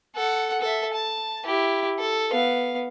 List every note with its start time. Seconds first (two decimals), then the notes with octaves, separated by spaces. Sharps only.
0.16 A4 F#5
0.61 A4 E5
0.93 A5
1.45 E4 G4
1.99 A4
2.31 B3 F5